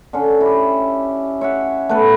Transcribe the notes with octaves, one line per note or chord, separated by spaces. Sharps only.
D3 C#4
E4 G4
C#5 E5 F#5
A3 B3 B4 B5